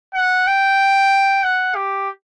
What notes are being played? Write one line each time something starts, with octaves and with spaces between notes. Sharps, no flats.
F#5
G5
F#5
G4